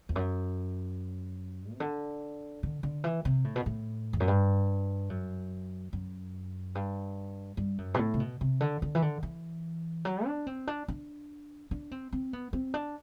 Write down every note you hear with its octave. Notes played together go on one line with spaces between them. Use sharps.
E2
F#2
C3
D3
D3
D3
E3
C3
A2
B2
A2
E2
F#2
G2
F#2
F#2
G2
G2
F#2
B2
A2
C3
B2
C3
D3
D3
E3
D3
E3
F#3
D4
C4
D4
D4
D4
C4
C4
B3
C4
D4